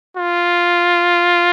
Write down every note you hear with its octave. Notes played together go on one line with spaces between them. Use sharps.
F4